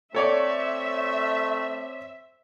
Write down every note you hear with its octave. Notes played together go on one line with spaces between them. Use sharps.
A3 C4 A4 C#5 D5 E5